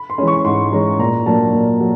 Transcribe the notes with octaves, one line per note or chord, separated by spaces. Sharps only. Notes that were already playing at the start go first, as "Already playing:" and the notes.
Already playing: B5
C6
E3 G#3 C#4
C#6
G#2 C6
E3 G#3 C#4 A#5
A#2 A#5
F#3 A#3 D4 A5
A#2
F#3